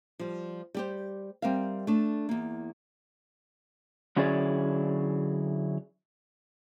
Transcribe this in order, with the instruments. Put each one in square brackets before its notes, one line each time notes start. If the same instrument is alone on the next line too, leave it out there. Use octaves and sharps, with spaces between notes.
[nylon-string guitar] F3 G3
G3 G4 C5
G3 C4 A#4 E5 F5
A3 D4
E2 A#3
[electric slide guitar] D3 F#3 C#4 E4 G#4 D5